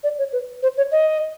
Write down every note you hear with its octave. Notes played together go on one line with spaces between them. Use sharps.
D5
C#5
B4
C5
C#5
D#5